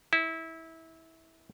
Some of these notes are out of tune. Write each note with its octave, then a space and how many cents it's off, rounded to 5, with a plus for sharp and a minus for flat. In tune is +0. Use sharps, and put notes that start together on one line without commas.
E4 -20